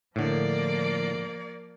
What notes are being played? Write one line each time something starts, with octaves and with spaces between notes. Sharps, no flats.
A2 D3 F3 A#3 D5